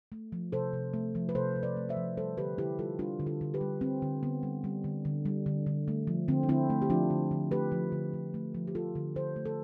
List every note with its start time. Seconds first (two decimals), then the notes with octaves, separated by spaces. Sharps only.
0.12 A3
0.32 F3
0.52 C3 A4 C5
0.73 C3
0.93 A3
1.15 F3
1.29 B4
1.35 C3 A4 C5
1.56 C3
1.63 B4 D5
1.77 A3
1.89 C5 E5
1.97 F3
2.17 G3 A4 C5
2.37 D3 G4 B4
2.58 D3 E4 G4
2.79 G3 F4 A4
2.99 G3 D4 F4
3.20 D3
3.26 F4 A4
3.41 D3
3.54 G4 B4
3.61 G3
3.81 G3 C4
4.02 D3
4.23 D3 B3
4.43 G3
4.64 G3
4.84 D3
5.05 D3
5.26 G3
5.46 D3
5.66 D3
5.88 A3
6.07 F3
6.28 D3 C4
6.43 D4
6.49 D3 C4 E4
6.70 A3
6.82 G4
6.90 F3 D4 F4
7.10 D3
7.31 D3
7.51 A3 G4 B4
7.72 F3
7.92 D3
8.13 D3
8.34 A3
8.54 F3
8.67 G4
8.75 A3 F4 A4
8.96 D3
9.16 D3 A4 C5
9.36 A3
9.46 A4